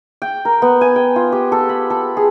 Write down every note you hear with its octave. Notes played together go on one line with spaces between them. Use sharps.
G5
A#4
B3
G#5
G5
F4
G4
A4
B5
A4
G#4